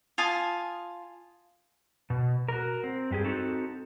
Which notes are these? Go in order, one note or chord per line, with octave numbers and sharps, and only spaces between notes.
F4 G#5 A5 D#6
B2
F#4 A#4
C4
G2 G4 G#4
C4 D#4 F#4 A4